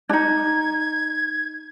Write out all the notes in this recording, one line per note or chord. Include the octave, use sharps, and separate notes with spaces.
D4 D#4 G#6